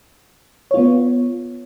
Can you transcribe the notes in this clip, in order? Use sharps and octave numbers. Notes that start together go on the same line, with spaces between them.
B3 F4 C#5